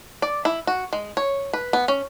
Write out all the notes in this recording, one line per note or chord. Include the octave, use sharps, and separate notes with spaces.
D5
E4
F#4
G#3
C#5
B4
B3
C#4